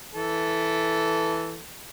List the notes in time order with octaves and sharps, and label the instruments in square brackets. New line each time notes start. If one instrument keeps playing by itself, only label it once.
[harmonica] E3 A4